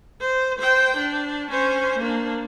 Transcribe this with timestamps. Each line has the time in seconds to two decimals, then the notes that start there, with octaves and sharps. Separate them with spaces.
0.20 C5
0.59 C5 G5
0.97 D4
1.51 C#4 C5
1.99 A#3 D4